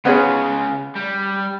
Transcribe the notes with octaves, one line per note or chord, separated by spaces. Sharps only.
C#3 B3 C#4 F4 G#4
G3